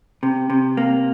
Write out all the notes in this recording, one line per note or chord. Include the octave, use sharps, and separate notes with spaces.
C3
C3
A#3